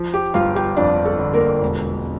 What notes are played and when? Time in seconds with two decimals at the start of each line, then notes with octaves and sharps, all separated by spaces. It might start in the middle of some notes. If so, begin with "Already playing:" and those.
Already playing: F3
0.14 G4
0.34 G1 F4 F5
0.55 G4 G5
0.76 F2 D4 D5
1.05 A4
1.19 D3
1.34 A#3 A#4
1.62 E1